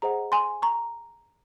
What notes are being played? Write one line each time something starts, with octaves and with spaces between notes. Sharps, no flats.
G#4 C5 D#5 F#5 A#5
G#5 C6
A#5 C#6